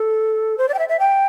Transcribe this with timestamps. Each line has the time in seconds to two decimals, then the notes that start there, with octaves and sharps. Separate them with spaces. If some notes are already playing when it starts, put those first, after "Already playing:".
Already playing: A4
0.58 C5
0.69 D5
0.74 G5
0.79 E5
0.89 E5
0.99 G5